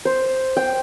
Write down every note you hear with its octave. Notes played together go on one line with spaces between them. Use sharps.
C5
G5